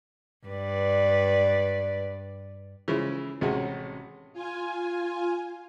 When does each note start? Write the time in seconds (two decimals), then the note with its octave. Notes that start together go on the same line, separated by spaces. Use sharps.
0.47 G2 B4 D5
2.88 C#3 E3 F3 G#3
3.41 A1 C3 G#3 C#4 F#4
4.33 F4 G#5